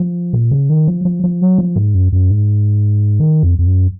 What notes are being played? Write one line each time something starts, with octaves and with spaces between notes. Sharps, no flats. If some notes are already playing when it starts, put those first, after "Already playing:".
Already playing: F3
A#2
C#3
D#3
F3
F3
F3
F#3
F3
G#2
F#2
F#2
G#2
D#3
F2
F2
F#2